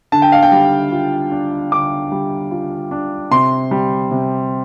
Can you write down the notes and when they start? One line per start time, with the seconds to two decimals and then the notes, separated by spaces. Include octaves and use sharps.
0.12 D3 A5
0.22 G5
0.32 F5
0.43 G5
0.52 G3
0.92 F4
1.31 D4
1.72 D3 D6
2.12 G3
2.51 F4
2.91 D4
3.31 C3 C6
3.71 G3
4.11 C3